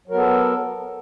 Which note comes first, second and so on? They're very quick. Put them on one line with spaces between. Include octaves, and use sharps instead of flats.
F#3 A#4 B3 A4